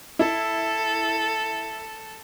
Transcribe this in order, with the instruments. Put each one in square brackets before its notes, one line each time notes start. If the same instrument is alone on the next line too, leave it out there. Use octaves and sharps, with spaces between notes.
[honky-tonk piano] E4 [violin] A4